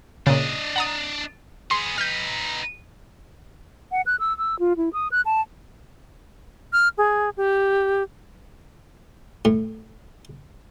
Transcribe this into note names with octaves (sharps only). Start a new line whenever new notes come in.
A#2 C#3 D4 D#5
F#5 A#5 D#6
B3 G#4 C6
D#4 B4 F6 G6
F#5
F#6
E6
E6
F4
E4
D#6
F#6
A5
F6
G#4
G4
A2